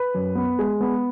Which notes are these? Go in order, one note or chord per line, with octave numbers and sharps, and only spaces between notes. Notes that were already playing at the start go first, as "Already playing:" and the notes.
Already playing: B4
F#2
B3
G#3
B3